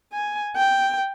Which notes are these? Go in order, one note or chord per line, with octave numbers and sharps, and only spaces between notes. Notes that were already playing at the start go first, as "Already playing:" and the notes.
G#5
G5